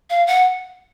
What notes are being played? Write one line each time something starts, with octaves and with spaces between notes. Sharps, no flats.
F5
F#5